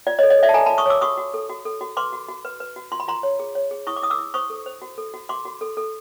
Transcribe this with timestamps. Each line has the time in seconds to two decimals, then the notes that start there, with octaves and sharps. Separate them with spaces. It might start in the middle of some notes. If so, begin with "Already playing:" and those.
0.07 F4 D5
0.19 C#5 D#5
0.23 A4
0.30 C#5 D#5
0.38 A4 D5 E5
0.49 A5
0.54 A4 G#5 A#5
0.66 A5 B5
0.70 F4
0.78 C#6 D#6
0.86 C#5 D6 E6
1.01 F#4 C#6 D#6
1.18 F#4
1.34 A4
1.49 F#4
1.65 A4
1.81 F#4
1.97 B4 C6 D6
2.13 F#4
2.29 F#4
2.45 B4
2.60 B4
2.76 F#4
2.92 F4 C6
3.00 B5
3.08 F4 A#5 C6
3.23 C#5
3.39 G#4
3.55 C#5
3.71 G#4
3.87 E4 C#6 D#6
3.96 D6
4.02 E4 D#6
4.10 D6 E6
4.18 E4
4.34 C5 C#6 D#6
4.50 A4
4.66 C5
4.82 F#4
4.98 A4
5.14 F#4
5.29 F#4 C6 D6
5.45 F#4
5.61 A4
5.77 A4